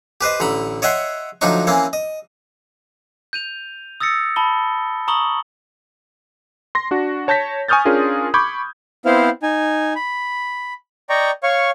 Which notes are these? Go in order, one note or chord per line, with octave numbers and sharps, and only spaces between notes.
G4 B4 C5 D#5
A1 D3 A#5 B5
C#5 D#5 E5 F#5 G5 C6
D2 F3 F#3 D4 D#4 C#6
E3 A#3 C4 C#4
D#5
G6 D#7 F7
D#6 E6 A6 A#6 C#7
A5 B5 G7
A#5 C#6 D#6 F#7 G7
C6 A#6
D4 F#4
C#5 A5 G6 A#6 B6
G#5 C#6 D#6 F6 G6 A6
C#4 D4 F4 G#4 A#4
B5 C#6 D6 G6 G#6
B3 C4 E4 C5 F5
D#4 G#5
B5
D5 D#5 G5 A#5 C#6
C#5 F5 C#6